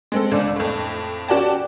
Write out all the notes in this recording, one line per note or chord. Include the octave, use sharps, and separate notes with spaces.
G#3 C4 A4
C#2 D3 D5
F2 A2
C#4 F#4 G4 D5 G5 A5